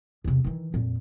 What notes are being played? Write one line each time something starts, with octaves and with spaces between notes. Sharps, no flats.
E2 C3
D#3 E3
F2 A#2